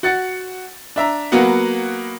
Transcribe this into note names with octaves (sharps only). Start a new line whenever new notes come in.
F#4 F#5 A6 C#7
D4 E5 A#5
F#3 A#3 B3 F#4 F#5